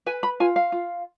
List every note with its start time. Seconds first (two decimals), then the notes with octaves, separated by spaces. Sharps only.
0.06 B4 G#5
0.23 B5
0.40 F4 G#5
0.56 F5
0.72 F4